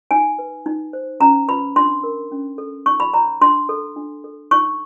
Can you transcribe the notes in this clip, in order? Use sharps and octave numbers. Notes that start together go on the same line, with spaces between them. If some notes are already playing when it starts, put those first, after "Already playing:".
D#4 G#5
B4
D#4
C5
C#4 A#5
B4 B5
D4 C6
A#4
C#4
A4
D#4 C#6
B5
C#5 A#5
D4 C6
A4
D4
A4
D#4 C#6